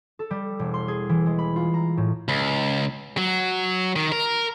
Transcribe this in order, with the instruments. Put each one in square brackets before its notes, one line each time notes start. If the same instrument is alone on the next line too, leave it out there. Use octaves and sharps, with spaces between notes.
[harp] A4
G3
E1
C6
G#4
E3
G#3
B5
F4
A#5
A2
[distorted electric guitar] C#2
F#3
D#3
A#4